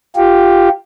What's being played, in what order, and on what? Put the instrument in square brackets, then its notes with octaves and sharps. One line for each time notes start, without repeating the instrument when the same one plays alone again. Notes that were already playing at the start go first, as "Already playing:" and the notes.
[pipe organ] F4 G4